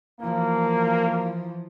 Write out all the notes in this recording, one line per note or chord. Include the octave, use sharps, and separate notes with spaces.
B2 E3 F3 A#3